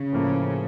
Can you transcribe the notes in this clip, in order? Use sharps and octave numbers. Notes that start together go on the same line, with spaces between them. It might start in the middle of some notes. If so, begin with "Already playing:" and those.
Already playing: C#3
A2 F3 A#3